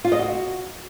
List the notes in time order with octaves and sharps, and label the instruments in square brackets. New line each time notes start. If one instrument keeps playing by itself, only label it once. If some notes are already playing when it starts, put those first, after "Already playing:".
[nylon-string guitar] F4
D#5
F#4